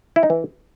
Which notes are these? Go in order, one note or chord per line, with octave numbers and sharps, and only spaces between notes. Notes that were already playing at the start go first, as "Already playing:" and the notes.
E4
D#4
E3